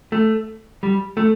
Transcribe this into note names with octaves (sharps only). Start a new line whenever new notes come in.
A3
G3
A3